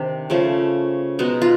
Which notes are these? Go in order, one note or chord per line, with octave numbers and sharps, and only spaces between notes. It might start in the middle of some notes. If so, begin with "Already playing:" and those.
Already playing: C3 D#3 D4
C#3 F3 A3
B2 G#3 B3 D#4
F4